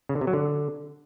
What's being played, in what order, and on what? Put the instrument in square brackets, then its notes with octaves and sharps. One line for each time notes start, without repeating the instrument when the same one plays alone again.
[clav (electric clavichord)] C#3
D3
C3
F#3
D3